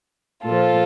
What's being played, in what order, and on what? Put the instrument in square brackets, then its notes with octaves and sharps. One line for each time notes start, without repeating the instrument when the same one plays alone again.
[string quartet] A#2 F3 F4 A4